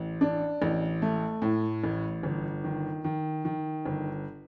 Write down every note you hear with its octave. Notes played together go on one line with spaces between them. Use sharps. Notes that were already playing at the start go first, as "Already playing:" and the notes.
Already playing: A1
D4
A1
A3
A2
A1
G1
D#3
D#3
D#3
G1